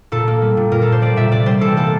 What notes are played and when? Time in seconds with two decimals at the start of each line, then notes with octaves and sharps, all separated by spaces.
0.12 A#2 A4
0.28 A#3
0.42 G3
0.57 A#2
0.72 A#2 A#4
0.82 A4
0.87 A#3
0.92 C5
1.02 G3 D5
1.17 A#2 E5
1.32 C3 D5
1.46 G3 C5
1.61 E3 A4
1.77 A#3 A4